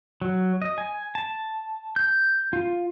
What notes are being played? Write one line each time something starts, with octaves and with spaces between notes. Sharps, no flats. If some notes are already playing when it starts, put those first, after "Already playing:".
F#3
D#5
G#5
A5
G6
F4